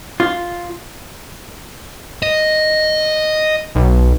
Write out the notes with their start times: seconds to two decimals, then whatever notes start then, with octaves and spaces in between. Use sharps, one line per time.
0.20 F4
2.23 D#5
3.75 B1